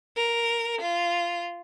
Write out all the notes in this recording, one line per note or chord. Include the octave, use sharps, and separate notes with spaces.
A#4
F4